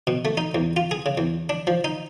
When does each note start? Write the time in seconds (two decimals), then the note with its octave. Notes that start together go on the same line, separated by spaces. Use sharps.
0.07 B2
0.25 A3
0.37 D#4
0.55 E2
0.77 F4
0.91 G#4
1.06 C#3
1.18 E2
1.49 D4
1.67 F3
1.84 D#4